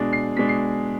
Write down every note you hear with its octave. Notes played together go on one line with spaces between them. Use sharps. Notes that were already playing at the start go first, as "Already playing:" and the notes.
Already playing: B2 G#3 D4
C7
B2 G#3 D4 B6
C7